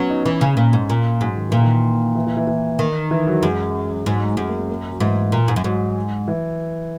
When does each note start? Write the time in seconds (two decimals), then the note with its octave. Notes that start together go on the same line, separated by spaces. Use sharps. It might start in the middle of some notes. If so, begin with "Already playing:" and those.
Already playing: F#3 B3 C#4
0.10 D#4
0.25 E3 C#4
0.41 C#3
0.57 A#2
0.73 G#2
0.90 A#2
1.21 G#2 F#3
1.37 D#3
1.49 A#2 E3
1.62 D#3
2.15 E3
2.27 E3
2.37 E3
2.47 E3
2.79 D#3
3.11 E3
3.27 F#3
3.43 F#2 G#3
4.06 G#2 F#3
4.37 F#2 G#3
4.48 A#3
4.59 C#4
4.70 A#3
4.90 F#3
5.00 G#2 E3
5.32 A#2
5.48 G#2
5.56 F#2
5.64 G#2 F#3
6.28 E3